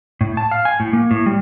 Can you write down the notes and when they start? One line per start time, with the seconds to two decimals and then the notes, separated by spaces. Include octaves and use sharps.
0.21 A2
0.37 A5
0.51 F5
0.65 G#5
0.80 A2
0.93 A#3
1.11 A2
1.26 G3